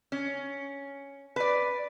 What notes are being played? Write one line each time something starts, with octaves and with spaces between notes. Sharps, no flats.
C#4
B4 D5